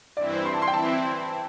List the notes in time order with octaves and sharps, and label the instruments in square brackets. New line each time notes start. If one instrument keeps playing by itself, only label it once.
[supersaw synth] G2 E3 C4 E4 [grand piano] D5
[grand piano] C6
A5
C6
G5
[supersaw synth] E3 C4 E4 [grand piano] A5